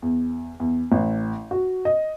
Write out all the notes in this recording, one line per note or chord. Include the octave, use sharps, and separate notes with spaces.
E2
E2
A1
F#4
D#5